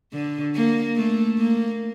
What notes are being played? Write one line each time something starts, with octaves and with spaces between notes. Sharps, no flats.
D3
A#3
A3
A#3